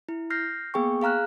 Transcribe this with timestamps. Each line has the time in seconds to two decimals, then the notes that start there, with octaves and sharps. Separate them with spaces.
0.09 E4
0.30 F6 G6 A#6 C7
0.74 A#3 B3 G#4 G5 C#6
1.01 G#4 F5 A#5 F6 F#6